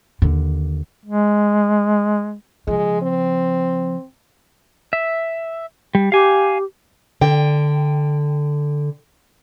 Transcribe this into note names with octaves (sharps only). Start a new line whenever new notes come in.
D#2 D3
G#3
C#3 F3 G#3
C4
E5
G3
G4 F5 G#5
D3 G5